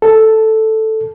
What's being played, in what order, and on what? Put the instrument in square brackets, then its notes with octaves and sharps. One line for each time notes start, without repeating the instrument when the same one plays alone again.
[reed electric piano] A4